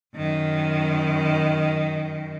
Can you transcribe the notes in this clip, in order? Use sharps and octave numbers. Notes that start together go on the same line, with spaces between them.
F#2 D#3